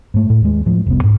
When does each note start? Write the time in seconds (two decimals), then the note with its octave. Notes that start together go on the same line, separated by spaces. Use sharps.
0.14 G#2 A3
0.30 A2
0.42 D#2 G#3
0.66 A2 F3
0.86 F1 C2 B3
1.04 G#2